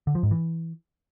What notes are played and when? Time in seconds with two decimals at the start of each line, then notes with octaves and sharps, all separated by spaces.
0.07 D3
0.15 F3
0.23 G#2
0.31 E3